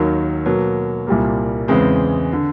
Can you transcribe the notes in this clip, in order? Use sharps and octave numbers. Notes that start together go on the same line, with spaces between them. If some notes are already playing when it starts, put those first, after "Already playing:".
Already playing: D#2 D#3 F#3
B2 F#3 A#3
C2 A#2 G3 A#3
E2 C#3 E3 G#3 C4
D3